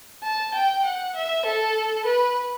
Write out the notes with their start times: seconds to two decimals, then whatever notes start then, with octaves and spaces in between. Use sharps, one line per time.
0.24 A5
0.54 G5
0.85 F#5
1.15 E5
1.45 A4
2.06 B4